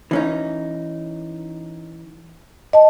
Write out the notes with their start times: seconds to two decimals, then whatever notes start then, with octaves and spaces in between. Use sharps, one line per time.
0.11 E3 C#4 D#4
2.73 D#5 A5